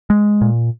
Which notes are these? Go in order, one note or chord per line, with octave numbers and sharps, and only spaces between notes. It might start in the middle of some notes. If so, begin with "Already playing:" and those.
G#3
A#2